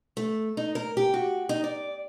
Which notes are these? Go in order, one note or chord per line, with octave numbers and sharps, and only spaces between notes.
A3
D#4
A#4
G4
F#4
D#4
D5